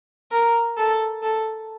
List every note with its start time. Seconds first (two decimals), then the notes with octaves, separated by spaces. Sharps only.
0.31 A#4
0.77 A4
1.22 A4